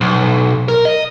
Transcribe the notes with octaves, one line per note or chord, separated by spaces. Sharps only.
B1
A#4
D#5